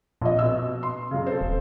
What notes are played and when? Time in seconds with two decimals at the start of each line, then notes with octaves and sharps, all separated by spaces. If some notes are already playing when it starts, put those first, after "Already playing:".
0.21 A#1 A#2 D#5
0.39 B2 E6
0.83 C6
1.11 F#2 C#3
1.27 A4 C5
1.41 D#1